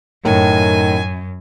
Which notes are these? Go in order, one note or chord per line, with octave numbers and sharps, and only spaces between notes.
F#2 A2 D#3 G#5